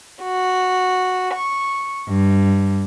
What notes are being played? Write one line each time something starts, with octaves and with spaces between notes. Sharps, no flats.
F#4
C#6
G2